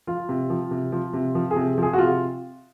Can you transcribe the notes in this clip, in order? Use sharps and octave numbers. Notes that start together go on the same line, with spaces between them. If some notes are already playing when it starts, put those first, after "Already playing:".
F3 F4
C3
F3
C3
F3
C3
F3
G#4
C3
F3 G#4
F#4
C3 F4